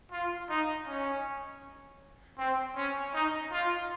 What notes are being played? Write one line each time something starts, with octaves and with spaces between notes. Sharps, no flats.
F4
D#4
C#4
C4
C#4
D#4
F4